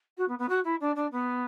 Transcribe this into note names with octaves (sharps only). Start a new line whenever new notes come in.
F#4
B3
B3
F#4
E4
D4
D4
B3